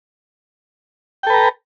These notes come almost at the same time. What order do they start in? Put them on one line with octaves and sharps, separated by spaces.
G5 A4 B4 A#5